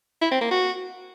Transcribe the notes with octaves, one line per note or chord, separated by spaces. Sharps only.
E4
C4
A#3
F#4